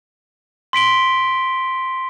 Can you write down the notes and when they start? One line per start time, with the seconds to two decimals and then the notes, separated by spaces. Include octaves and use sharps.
0.73 C6 B6 D7 G7